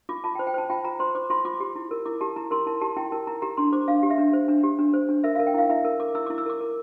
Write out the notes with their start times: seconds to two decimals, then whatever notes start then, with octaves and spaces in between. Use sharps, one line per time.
0.09 F4 D6
0.24 F4 A5
0.35 G5
0.39 C5
0.47 G5
0.54 C5 A5
0.70 F4 G5
0.85 F4 A#5
1.00 C5 C6
1.15 C5 D6
1.30 F4 C6
1.45 F4 D6
1.60 G4
1.76 E4
1.91 A#4
2.06 E4 D6
2.21 G4 A5
2.36 E4 A#5
2.51 A#4 C6
2.66 E4 A5
2.81 G4 A5
2.96 E4 G5
3.12 A#4 A5
3.27 E4 A#5
3.42 G4 A#5
3.57 D4 C6
3.72 C5 D6
3.88 D4 F5
4.03 G4
4.10 E5
4.18 D4
4.33 C5
4.48 D4
4.64 G4
4.79 D4
4.94 C5
5.09 D4
5.24 A#4 E5
5.35 A#4 F5
5.47 G5
5.54 E4 F5
5.70 E4 E5
5.85 A#4
6.00 A#4 D6
6.15 E4 E6
6.26 E4 D6
6.38 E6
6.46 A#4 D6
6.61 A#4